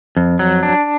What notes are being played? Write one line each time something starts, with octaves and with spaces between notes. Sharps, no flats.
F2
F#3
D4